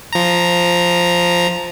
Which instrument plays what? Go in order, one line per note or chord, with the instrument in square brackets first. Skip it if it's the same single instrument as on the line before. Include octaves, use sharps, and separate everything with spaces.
[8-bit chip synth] F3 A#5